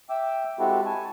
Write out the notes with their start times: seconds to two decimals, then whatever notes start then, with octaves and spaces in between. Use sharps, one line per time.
0.09 E5 G5 D6 E6
0.59 G#3 C4 E4 F#4 G4 A4
0.86 G#5 A5 C#6